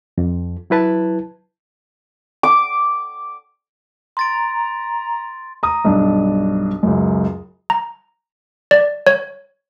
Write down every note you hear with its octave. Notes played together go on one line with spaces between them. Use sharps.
F2
F#3 E4 B4 A5
D6
A#5 C6 A6 D7
A#5 D#6
B1 G2 D4
C#2 F#2
A#5
D5
C#5